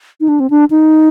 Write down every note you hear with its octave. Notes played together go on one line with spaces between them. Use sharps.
D#4
D4
C4
D4
D#4